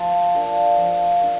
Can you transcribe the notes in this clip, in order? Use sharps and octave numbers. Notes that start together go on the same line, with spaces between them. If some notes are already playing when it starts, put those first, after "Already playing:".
Already playing: F3 A5 C6
A#3 D4 F4
F3
A#3 D4 F4